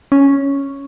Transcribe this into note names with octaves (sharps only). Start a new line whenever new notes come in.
C#4